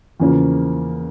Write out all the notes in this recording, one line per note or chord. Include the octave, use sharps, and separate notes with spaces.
E2 C#3 F3 A#3 C#4